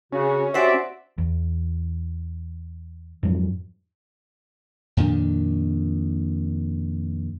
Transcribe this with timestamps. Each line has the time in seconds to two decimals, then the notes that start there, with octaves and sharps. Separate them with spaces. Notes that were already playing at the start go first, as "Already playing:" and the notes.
0.13 C#3 C#4 F#4
0.54 F#4 G4 C5 D5 E5
1.18 E2
3.23 F2 G#2 F3 F#3
4.97 F2 A#2 D#3 D4